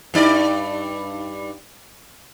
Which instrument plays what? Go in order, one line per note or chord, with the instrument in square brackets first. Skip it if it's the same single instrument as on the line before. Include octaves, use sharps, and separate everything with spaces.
[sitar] G2 D#4 D5